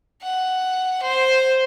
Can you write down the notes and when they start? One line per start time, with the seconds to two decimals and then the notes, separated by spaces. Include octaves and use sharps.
0.22 F#5
1.02 C5